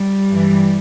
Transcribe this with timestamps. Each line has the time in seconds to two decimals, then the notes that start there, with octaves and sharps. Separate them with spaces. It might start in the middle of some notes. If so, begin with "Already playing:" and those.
Already playing: G3
0.30 G2 E3